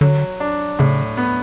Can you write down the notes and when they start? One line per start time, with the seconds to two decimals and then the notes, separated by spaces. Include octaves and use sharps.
0.01 D3 F#3
0.40 D4
0.79 A2 C#3
1.17 B3